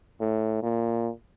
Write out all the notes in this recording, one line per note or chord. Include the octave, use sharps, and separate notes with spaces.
A2
A#2